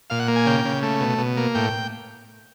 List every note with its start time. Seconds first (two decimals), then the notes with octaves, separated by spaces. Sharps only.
0.10 A#2 F5
0.19 F#5
0.28 A#3
0.36 G#5
0.46 C#3 G5
0.65 C#3
0.83 A3
1.01 B2
1.18 B2
1.37 A#3
1.55 A2 G5